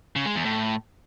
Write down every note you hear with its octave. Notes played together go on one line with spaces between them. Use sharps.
C#3
G#3
E2
A2